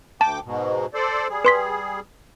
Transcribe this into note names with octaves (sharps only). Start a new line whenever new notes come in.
D2 G5 A5 D6
G#2 B2
A4 C5 D5
G3 G#4
B4 C6 B6